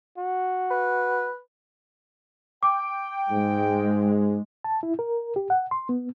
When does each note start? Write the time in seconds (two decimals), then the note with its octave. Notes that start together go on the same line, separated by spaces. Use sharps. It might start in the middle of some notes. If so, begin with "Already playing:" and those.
0.18 F#4
0.71 B4
2.63 G5 D6
3.31 G#2 G#3
4.64 A5
4.83 E4
4.99 A#4
5.36 G4
5.50 F#5
5.71 C6
5.89 B3